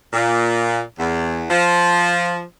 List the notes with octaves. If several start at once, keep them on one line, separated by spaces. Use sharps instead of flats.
A#2
E2
F3